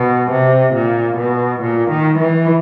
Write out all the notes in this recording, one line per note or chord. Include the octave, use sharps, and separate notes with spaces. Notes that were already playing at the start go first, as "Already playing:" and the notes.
Already playing: B2
C3
A#2
B2
A#2
D#3
E3